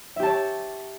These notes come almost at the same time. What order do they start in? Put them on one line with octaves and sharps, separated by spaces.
E5 G4 A5 C#5 C#6